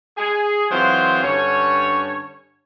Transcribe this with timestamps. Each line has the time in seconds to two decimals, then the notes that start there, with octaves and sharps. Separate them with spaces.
0.18 G#4
0.70 E3 F#3 G#3 C4 F4 C5
1.23 G2 D3 C#4 C#5